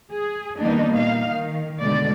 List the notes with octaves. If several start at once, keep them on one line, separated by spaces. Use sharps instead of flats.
G#4
D#3 G3 A#3 B3 D4 D#4
A#2 D#4 F5
D#3
B2 D3 G#3 D5